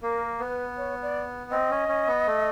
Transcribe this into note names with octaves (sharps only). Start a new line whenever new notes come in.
A#3 A#4
B3 B4
C#5
D5
C4 D#5
C#4
C#4
B3
A3